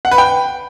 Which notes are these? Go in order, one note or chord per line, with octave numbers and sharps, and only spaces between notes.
F#5
B4
G5